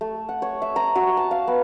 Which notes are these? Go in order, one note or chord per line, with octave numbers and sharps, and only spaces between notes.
A3
F#5
C#5
E5
A#5
F#4
A5
F5
B3